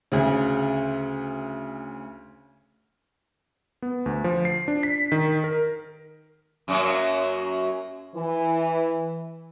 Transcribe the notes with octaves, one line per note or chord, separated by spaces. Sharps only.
D2 C#3
B3
D2
F3
C7
D4
B6
D#3
A#4
F#2 F#3 A#3
E3